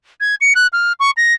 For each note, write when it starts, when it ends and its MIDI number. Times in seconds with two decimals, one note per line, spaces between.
0.21 0.35 92
0.41 0.53 97
0.55 0.67 90
0.73 0.93 89
1.00 1.11 85
1.17 1.34 94